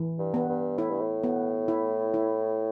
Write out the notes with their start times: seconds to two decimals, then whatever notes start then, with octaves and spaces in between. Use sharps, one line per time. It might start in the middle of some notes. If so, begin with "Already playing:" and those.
Already playing: E3
0.19 G2
0.34 B3
0.49 G2
0.78 A2 E4
0.90 G2
1.01 A2
1.23 B3
1.68 E4
2.14 E4